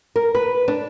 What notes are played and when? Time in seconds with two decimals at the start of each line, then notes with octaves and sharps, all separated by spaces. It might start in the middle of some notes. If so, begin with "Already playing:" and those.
0.16 A#4
0.35 B4
0.68 D4